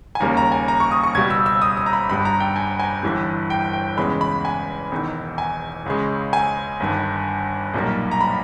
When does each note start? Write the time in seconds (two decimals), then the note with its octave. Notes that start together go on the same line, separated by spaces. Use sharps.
0.15 G#5
0.20 D#2 C#3 G3 A#3 A#5
0.37 A#5
0.52 G#5
0.68 A#5
0.80 C#6
0.91 D#6
1.03 C#6
1.15 C#2 B2 G3 G#6
1.30 E6
1.46 E6
1.62 D#6
1.77 D#6
1.86 A#5
1.93 B5
2.09 G1 G2 G3 B5
2.25 A#5
2.40 G5
2.56 G#5
2.79 G#5
3.03 G1 G2 E3 G3
3.50 G5
3.73 G5
3.97 E2 C#3 G#3 B5
4.21 B5
4.45 G#5
4.92 E1 E2 D#3
5.38 G#5
5.86 C#2 C#3 G#3
6.33 G#5
6.80 G1 G2 D#3
7.74 B1 A#2 G3 A#3
8.11 A#5
8.21 B5